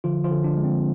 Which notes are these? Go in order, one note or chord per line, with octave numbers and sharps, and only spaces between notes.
D3 F3 F4
F3 F4
D3
D4
G#3
C4